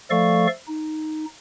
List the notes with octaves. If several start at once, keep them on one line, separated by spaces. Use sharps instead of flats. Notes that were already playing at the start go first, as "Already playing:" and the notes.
F3 A3 A4 D5 F5 C#6
D#4